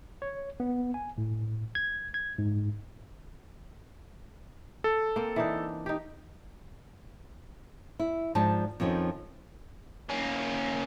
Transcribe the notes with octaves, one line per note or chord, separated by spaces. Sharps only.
C#5
B3
G#5
A2
G#6
G#6
G#2
A4
A#3 C4
E3 D4 D#4
D#4 G4
E4
G#2 F3 D4 A5
F2 D#3 F3 C#4 D#4
A#3 C#4